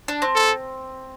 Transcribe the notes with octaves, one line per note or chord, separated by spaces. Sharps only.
D4
C4
A4